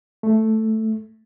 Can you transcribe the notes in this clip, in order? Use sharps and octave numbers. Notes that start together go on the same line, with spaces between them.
A3